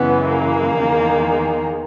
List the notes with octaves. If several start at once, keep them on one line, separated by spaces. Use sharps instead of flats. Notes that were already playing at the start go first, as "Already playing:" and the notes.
Already playing: F#2 C#3 E3 G#3 B3
A#3
E2 D#3 G#3